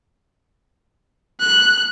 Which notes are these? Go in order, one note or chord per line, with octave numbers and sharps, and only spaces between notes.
F#6